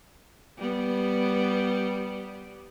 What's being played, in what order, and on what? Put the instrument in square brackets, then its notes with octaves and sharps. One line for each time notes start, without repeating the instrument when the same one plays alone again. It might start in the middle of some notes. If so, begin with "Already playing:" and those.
[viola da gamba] G3 B3